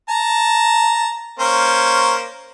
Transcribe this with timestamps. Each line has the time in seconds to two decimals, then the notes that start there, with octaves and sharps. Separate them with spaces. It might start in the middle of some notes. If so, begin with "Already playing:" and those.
0.09 A5 A#5
1.39 A#3 C#4 C5